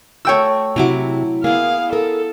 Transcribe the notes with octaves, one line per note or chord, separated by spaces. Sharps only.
A3 F#4 C#5 G5 E6
C3 F#3 E4 F#4 D6
A#3 B3 E4 G#4 F5
A4 A#4